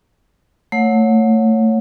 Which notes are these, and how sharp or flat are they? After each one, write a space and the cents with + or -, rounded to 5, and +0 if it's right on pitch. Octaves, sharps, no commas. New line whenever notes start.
A3 +20 C#5 +0 F#5 -25